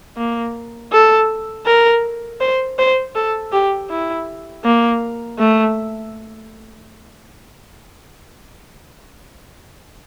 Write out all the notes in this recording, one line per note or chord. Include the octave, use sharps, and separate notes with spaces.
A#3
A4
A#4
C5
C5
A4
G4
E4
A#3
A3